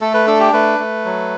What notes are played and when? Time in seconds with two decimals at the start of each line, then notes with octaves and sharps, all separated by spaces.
0.01 A3 A4
0.14 B4
0.27 D4 A4
0.40 G4
0.53 A3 B4
0.79 A3
1.05 F#3